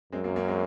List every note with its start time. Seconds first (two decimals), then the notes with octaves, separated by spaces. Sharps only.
0.12 F#2 G#3 C4
0.24 F#3 A#3
0.36 A#3 C#4
0.48 G#3 C4